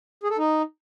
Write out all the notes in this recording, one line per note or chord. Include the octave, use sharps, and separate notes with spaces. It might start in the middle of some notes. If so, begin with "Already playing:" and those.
G#4
A4
D#4